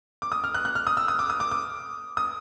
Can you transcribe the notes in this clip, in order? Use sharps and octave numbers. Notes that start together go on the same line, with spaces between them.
D6
D#6
F6
F#6
F#6
F6
D#6
E6
D#6
D6
D#6
D6
D6
D#6